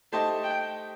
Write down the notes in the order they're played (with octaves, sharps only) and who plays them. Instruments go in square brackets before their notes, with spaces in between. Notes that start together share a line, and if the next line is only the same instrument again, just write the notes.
[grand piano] A3 D#4 G4 C5 D#5 [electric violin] A5
[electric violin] G5